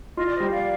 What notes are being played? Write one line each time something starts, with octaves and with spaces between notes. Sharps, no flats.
F4 D#5
D5
G3 C5 D#5
D5 F5